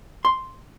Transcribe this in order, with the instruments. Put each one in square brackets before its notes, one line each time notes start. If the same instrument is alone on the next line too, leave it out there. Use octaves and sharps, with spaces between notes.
[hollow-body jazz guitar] C6